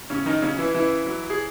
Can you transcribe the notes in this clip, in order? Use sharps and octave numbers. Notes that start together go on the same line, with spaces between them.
A2 C#3 C#4
D#3 D#4
C#3 F#3 C#4
E3 E4
C#3 E3 E4
F#3
G#4